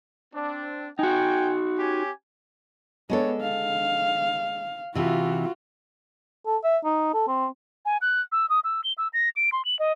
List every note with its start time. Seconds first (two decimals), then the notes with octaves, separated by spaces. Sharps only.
0.34 C4 D4
0.99 D#4 F#4 G5 G#5
1.79 C#4 G4 G#5
3.10 G#3 B3 D4 A4 C#5
3.41 F5
4.95 C3 E3 F4 F#4
6.46 A4
6.64 E5
6.85 D#4
7.14 A4
7.28 C4
7.85 G#5
8.01 F#6
8.32 E6
8.50 D#6
8.64 E6
8.84 G7
8.98 E6
9.13 A#6
9.36 D7
9.52 C6
9.65 F#7
9.79 D#5